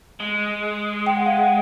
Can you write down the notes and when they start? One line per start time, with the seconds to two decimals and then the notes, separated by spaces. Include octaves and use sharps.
0.20 G#3
1.06 G5
1.17 F#5
1.26 F5
1.37 F#5